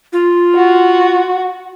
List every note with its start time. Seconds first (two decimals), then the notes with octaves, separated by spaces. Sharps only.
0.13 F4
0.55 F#4